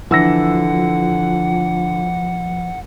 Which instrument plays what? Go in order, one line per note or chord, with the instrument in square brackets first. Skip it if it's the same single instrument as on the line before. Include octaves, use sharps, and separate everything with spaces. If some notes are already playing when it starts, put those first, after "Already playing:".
[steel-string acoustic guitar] D3 [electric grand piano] E3 E6 A#6 [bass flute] F3 [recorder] F#5